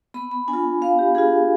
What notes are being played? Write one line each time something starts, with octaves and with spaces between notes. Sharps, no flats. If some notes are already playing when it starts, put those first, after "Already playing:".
B3 B5
B5
D4 G#5
F4
B3 F5
G4
D4 F4 G#4